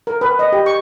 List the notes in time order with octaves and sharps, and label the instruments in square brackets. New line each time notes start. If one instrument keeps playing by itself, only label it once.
[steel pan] A#4
B4
D#5
G4
C#6